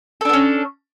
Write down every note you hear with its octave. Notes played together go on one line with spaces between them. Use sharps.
B3 C#4 D4 A4